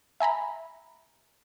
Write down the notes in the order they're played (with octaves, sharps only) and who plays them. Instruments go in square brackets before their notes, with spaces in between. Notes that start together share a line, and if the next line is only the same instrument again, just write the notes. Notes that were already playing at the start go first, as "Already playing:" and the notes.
[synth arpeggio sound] E5 G#5 A#5 B5